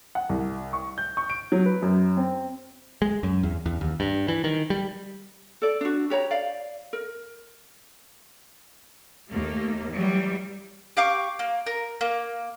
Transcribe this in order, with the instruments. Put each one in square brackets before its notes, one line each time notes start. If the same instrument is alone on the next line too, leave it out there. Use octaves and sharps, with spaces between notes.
[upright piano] F#5
C2
C#6
G6
C#6
D7
F#3
B4
F#2
C4
[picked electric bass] G#3
F#2
E2
E2
D#2
G2
E3
D#3
G3
[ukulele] A4 D5
D4 F#4
G4 C#5 A5 A#5
D5 F5
A#4
[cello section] D#2 A3 A#3
E3 F#3 G3
[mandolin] G4 F5 C#6 D6
A#3
A#4
A#3